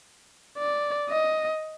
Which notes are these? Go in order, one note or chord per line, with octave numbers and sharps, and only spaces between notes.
D5
D#5